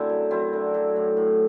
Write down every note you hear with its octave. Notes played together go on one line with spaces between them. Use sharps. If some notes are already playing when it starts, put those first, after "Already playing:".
Already playing: F#2 D3 A3 C4 E4
F#3
F#3 C4 E4
D3
F#3
A2
A2